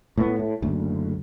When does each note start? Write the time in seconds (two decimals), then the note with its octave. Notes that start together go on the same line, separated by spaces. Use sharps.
0.17 A2 B3
0.39 A2
0.62 F#1 D2